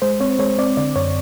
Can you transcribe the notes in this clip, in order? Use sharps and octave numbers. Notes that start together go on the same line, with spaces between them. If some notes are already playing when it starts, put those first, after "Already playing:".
G#3 C5
C4 C#5
G#3 C#5
C4 D5
D3 D5
F#2 C#5